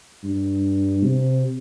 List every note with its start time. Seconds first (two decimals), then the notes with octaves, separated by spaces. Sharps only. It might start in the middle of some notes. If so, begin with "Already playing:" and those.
0.24 G2
1.04 C3